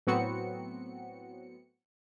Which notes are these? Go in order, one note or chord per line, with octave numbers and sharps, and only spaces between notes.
A2 F#3 B3 C4 F#4 C#7